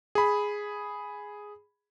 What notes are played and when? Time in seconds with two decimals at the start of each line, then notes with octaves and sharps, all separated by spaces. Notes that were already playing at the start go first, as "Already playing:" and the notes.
0.15 G#4 B5